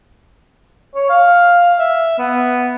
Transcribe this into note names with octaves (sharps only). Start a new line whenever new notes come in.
C#5
F5
E5
B3